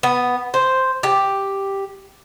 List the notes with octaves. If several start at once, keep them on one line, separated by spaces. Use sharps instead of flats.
B3
C5
G4